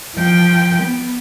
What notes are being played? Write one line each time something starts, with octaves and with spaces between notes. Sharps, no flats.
F3 G5
B3